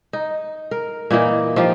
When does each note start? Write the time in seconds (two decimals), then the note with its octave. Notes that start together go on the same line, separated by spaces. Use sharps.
0.13 D#4
0.71 A#4
1.11 A#2 E3 A#3 D#4
1.56 F3 D#4 F4 G4